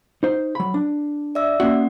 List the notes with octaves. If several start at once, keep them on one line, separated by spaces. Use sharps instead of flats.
D#4 C5
F#3 B5
D4
D5 E5 E6
A#3 C#4 F#4 F#5